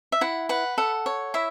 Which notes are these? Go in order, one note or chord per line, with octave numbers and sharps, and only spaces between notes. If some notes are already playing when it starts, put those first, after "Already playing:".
E5
E4 F#5
B4 F#5
A4 F#5
C#5
E4 E5